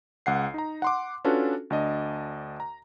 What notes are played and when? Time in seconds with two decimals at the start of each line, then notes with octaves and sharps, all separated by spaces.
0.26 C#2 F#5 C7
0.54 D#4 A#5
0.82 F#5 C6 D6
1.25 C#4 D4 F4 F#4 A4 B4
1.70 D2 D4 D#5
2.60 A#5